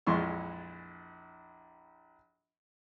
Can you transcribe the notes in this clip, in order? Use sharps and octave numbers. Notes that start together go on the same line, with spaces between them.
A#1 F2 E3 G#3 C6 C#6